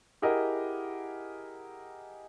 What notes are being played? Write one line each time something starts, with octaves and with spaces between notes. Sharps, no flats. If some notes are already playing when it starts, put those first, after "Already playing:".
E4 G4 G#4 A#4 D#5 F#5